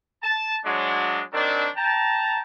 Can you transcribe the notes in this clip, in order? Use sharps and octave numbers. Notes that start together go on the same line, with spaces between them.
A5
F#3 G#3 D4
D#3 F#3 C4 D4
G5 A5 A#5